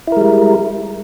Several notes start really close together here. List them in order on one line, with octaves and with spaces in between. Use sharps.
E4 A#4 G#3 G3